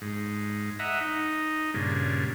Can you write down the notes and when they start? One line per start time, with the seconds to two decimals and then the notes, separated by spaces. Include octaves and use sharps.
0.01 G#2
0.79 D#5 E5 F#5 A#5
1.01 D#4
1.74 G2 A#2 C#3